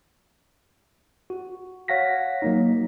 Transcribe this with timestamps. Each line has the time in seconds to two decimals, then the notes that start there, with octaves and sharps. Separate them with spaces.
1.30 F#4
1.88 C#5 F5 F#5 A#6 B6
2.42 F#3 A#3 D#4